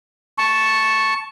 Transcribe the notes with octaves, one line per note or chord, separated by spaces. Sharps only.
A5 C#6